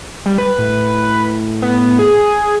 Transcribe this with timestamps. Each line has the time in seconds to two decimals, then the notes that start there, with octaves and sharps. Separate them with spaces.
0.26 G3
0.38 B4
0.58 A2
1.62 B3
1.99 G#4